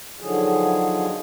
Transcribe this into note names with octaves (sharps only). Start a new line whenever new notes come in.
D3 D#3 F3 F#3 G#4